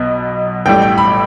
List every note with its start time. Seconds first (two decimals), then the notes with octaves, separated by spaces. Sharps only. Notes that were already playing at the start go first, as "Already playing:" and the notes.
Already playing: B1 B2 B3
0.66 A1 A2 G3 G5
0.82 G5
0.98 B5